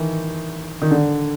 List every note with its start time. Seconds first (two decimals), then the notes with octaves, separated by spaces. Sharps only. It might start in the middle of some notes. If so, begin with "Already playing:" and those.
Already playing: D#3 E3
0.82 D#3
0.91 D3